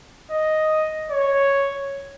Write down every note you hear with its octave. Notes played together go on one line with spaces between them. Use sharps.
D#5
C#5